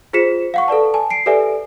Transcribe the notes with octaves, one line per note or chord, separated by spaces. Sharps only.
F4 G#4 C5 B6 C#7 E7
F5 F#5 C#6
A4 B4 D5 A5
G#5 A5
C7 D7
G4 A4 B4 D5 E5 G#5